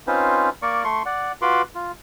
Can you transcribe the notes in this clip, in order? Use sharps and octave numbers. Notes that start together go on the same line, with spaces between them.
C4 C#4 D#4 F4 B4 C5
A#3 A#4 D5 C#6
A3 C6 C#6
D5 F#5
F4 F#4 B4 B5 C6 D6
F4